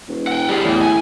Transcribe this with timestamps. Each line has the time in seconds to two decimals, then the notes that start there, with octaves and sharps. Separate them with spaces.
0.08 E1
0.27 F#5 G5
0.49 G3 G#4
0.65 E2 A2
0.81 G#5